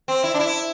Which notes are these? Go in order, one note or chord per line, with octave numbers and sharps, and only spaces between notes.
C4
E4
D4
E4